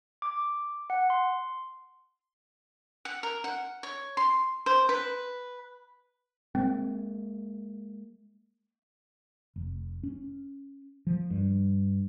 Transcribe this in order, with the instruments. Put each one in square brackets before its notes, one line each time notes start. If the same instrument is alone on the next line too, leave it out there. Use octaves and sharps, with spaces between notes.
[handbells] D6
F#5
C6
[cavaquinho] F#5
A#4
F#5
C#5
C6
C5
B4
[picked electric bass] G#3 A#3 [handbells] C4
[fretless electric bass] F1
C#4
F3
G2